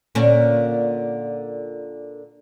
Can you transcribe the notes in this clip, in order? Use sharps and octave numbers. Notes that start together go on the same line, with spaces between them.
A#2 D3 C#4